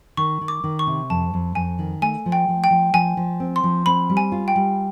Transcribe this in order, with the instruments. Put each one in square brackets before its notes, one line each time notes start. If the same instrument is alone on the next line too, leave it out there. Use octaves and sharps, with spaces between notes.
[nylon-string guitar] D#3 [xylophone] C#6
[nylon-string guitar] D#3
[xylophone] D6
[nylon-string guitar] D#3
[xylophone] C#6
[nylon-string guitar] C3
[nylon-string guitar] F2 [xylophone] A5
[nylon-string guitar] F2
[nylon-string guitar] F2 [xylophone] G#5
[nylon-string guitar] D#3
[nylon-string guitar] A3 [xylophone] G#5
[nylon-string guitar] F3
[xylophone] G5
[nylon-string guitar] F3
[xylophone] G5
[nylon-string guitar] F3
[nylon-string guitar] F3 [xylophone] G#5
[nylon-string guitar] F3
C4
[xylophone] C6
[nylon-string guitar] F3
[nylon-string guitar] C4 [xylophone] B5
[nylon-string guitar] G3
[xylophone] G#5
[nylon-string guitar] F4
[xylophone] G5
[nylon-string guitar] G3